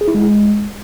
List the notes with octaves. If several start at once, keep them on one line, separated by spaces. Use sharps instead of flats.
G#4
E4
G#3